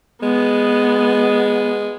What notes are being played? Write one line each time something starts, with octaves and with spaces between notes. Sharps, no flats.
G#3 B3